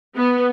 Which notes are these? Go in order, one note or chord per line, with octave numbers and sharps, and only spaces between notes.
B3